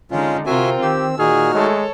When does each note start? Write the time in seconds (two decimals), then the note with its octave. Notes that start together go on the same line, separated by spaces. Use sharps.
0.11 D3 G#3 C#4 D#4 F4
0.46 C3 C4 F4 F#4 A#4 E5 G#5
0.82 D#3 G4 E6
1.19 A#2 D#4 F#4 G#4 F6
1.54 G#3 A3 A4 C#5